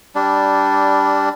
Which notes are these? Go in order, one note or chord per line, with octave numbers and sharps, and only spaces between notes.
G3 D4